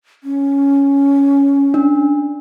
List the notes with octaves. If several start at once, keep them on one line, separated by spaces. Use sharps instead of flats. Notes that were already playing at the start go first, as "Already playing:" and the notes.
C#4
D4